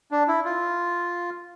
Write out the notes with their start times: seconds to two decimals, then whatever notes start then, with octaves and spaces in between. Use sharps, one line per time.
0.11 D4
0.28 E4
0.45 F4